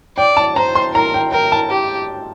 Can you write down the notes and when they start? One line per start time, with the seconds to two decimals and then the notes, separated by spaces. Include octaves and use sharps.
0.18 D5 G5
0.37 A5
0.56 C5 A#5
0.75 C6
0.94 A#4 A#5
1.14 G5
1.32 A#4 G5
1.52 A5
1.71 G4